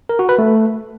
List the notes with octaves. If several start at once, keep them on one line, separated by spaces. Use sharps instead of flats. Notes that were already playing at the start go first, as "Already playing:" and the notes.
A#4
F#4
B4
A3